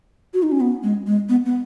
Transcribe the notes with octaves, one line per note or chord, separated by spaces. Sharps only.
F#4
D#4
C#4
B3
G#3
G#3
B3
B3